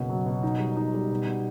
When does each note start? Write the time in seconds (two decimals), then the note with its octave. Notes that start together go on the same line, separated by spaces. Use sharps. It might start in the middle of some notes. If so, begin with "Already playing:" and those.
Already playing: F#1 B2
0.09 F#3
0.26 B2
0.43 D#4
0.59 G3
0.77 D#4
0.94 G3
1.11 B2
1.27 B2